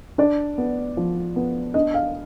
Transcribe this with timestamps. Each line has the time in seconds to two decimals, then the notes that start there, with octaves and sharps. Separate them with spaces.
0.18 D4 D5
0.58 B3
0.97 F3
1.36 B3
1.74 D4 D#5
1.94 F5